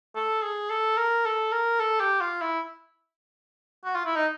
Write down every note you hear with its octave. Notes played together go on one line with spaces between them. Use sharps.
A4
G#4
A4
A#4
A4
A#4
A4
G4
F4
E4
F#4
F4
E4
D#4